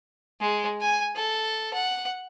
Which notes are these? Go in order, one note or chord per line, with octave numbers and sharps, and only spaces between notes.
G#3
G#5
A4
F#5